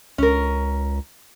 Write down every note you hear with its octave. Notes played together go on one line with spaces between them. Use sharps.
C#2 C#4 A#4